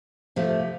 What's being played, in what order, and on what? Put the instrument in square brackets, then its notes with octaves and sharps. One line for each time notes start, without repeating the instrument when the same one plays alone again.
[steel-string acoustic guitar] C3 F3 A3